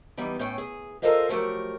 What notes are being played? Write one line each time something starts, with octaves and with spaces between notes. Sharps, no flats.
E3 G3 B3 D#4
A2 C#4 G5
G#4
F4 A4 A#4 C5 D#5 F5
F3 F#3 A3 G4 A#4